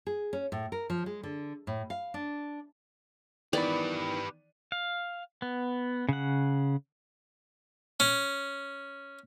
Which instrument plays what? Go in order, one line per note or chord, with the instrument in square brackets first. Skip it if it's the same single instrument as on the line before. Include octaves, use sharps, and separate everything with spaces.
[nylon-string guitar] G#4
C#4
A2
A#4
F3
G#3
D3
A2
F5
D4
[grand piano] D#3 E3 B3 [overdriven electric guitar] G4 B4 [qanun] D5
[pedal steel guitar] F5
B3
C#3 F#5
[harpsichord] C#4